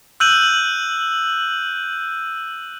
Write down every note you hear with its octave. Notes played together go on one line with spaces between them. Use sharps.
E6 F#6 G6 D#7 F#7